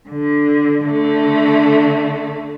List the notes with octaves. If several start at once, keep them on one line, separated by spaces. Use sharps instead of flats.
D3
D3 A3